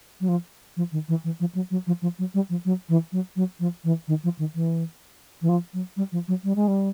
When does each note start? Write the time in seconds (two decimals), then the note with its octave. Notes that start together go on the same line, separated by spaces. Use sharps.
0.20 F#3
0.28 F3
0.77 F3
0.92 D#3
1.08 E3
1.24 E3
1.40 F3
1.55 F#3
1.71 F#3
1.87 F3
2.02 F3
2.19 F#3
2.34 G3
2.49 F3
2.65 F#3
2.89 E3
3.12 F#3
3.36 F#3
3.59 F3
3.84 E3
4.08 D#3
4.24 F3
4.38 D#3
4.55 E3
5.42 E3
5.49 F3
5.73 F#3
5.96 G3
6.12 F3
6.28 F#3
6.44 G3
6.56 G#3
6.68 G3